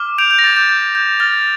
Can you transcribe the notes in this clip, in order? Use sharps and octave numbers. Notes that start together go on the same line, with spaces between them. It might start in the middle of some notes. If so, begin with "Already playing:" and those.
Already playing: D6 F6
G6 D7 F7
G6
A#6
D6 A6
G6
G6
G6
F6 A6